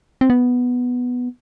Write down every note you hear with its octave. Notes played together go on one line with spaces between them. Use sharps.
C4
B3